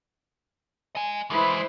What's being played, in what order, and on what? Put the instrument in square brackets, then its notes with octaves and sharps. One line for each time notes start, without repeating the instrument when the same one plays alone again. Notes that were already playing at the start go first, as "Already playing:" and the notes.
[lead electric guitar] D#5 G#5
[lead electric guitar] E3 G#3 [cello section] E4 B4 C5